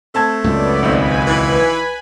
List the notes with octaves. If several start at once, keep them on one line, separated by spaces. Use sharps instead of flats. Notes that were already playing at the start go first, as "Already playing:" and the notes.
A3 C4 A5 G#6
C#2 F#2 B3 D5
B1 D#3 C4 B4 G#5 B5
E3